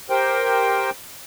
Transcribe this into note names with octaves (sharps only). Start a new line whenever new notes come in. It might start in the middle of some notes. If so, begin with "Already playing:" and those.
G4 A#4 C5 G5